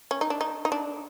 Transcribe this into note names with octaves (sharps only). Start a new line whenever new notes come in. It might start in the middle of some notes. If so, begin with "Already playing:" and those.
C#4
D#4
D4
D#4
D#4
D4